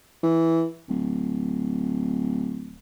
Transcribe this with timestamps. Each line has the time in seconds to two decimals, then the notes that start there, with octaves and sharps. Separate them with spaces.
0.23 E3
0.89 D1